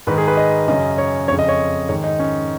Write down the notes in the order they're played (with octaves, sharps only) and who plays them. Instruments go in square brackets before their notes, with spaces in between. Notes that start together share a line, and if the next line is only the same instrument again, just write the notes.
[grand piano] G#2 D#3 B4
G#4
B4
D#5
F#2 C#3 D#5
C#5
F2 C#3 C#5
D#5
C#5
G#2 D#3 C#5
D#4
C#4